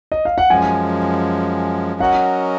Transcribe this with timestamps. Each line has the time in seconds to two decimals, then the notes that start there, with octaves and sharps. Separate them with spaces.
0.12 D#5
0.25 F5
0.38 F#5
0.50 F#2 F3 G#3 G#5
2.00 F#3 C#4 F#4 A#4 D#5 F#5